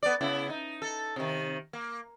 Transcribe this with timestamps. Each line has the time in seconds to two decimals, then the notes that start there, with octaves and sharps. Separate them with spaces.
0.03 B3 A4 D5
0.21 C#3 B3 E4
0.49 D#4
0.82 A4
1.16 C3 D#3
1.73 A#3